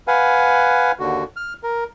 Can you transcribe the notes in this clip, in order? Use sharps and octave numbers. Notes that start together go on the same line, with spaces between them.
B4 F5 F#5 G#5
D#2 D3 F#4
F6
A#4